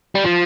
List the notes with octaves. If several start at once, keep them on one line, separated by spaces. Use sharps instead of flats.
G3
F3